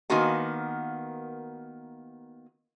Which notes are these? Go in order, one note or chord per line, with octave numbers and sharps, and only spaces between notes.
D#3 A#3 B3 F4 F#4 G#5